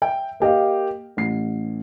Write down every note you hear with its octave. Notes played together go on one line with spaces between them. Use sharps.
E5 G5
A#3 G4 D#5 F5
A1 C7